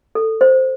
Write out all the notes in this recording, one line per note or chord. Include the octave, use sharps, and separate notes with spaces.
A4
C5